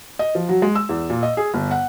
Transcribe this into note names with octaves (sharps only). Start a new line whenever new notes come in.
D#5
F3
F#3
G#3
E6
E2
A#2
D#5
G#4
G1
F#5